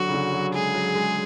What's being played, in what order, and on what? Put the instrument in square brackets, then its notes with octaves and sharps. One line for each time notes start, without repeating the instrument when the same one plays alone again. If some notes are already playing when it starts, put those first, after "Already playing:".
Already playing: [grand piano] D3 F#3 [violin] F#4
[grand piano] C#3
D3
F#3
[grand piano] G#3 [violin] G#4
[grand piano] F#3
G#3